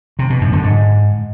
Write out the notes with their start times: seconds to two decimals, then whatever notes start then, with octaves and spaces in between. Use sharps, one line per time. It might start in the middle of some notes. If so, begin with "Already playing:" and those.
0.19 C3
0.30 B2
0.41 F#2
0.53 D3
0.64 G#2